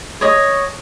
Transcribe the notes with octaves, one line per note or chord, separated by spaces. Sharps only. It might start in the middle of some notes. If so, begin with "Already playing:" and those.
C#5 D#5